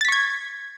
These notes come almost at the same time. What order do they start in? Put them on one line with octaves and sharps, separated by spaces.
A6 B6 C#6 G#6